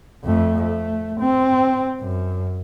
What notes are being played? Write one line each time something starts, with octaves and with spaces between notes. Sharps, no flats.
F2 A3
A3
C4
F#2